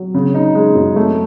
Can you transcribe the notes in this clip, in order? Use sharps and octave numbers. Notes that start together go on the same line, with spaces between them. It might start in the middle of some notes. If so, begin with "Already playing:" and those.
Already playing: F#3
C#3
D#4
G#3
F#2
A3